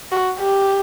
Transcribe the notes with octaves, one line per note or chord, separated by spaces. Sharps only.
F#4
G4